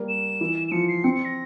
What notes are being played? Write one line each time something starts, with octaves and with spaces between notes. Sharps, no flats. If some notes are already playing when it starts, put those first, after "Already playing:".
Already playing: G3 A#3
E7
E3
E7
F3 C#7
C7
C4 C#7
C#7
A#6